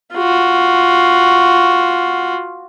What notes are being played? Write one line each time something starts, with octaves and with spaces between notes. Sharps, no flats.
F4 F#4